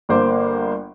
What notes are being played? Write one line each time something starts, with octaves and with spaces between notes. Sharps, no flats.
G1 A#3 C5 D6